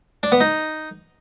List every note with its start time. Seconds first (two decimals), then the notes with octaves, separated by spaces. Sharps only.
0.23 D4
0.32 B3
0.41 D#4